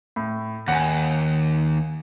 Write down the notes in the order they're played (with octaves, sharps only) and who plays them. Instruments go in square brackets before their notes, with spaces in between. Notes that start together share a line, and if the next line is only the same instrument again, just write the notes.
[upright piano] A2
[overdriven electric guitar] D#2 [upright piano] F#5 G#5